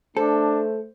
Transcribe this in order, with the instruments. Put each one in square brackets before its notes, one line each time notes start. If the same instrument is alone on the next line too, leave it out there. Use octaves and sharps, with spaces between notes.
[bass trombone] A3 [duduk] D4 [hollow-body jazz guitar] A4 [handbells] C5